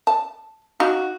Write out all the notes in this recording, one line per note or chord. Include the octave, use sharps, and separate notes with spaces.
A5
D#4 F#4 F5